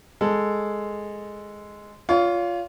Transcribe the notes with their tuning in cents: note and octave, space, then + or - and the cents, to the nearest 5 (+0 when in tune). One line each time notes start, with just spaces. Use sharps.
G#3 +0 A4 +0
F4 +0 C#5 +40